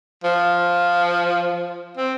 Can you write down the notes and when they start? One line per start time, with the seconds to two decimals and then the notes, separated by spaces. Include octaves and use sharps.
0.24 F3
1.97 C4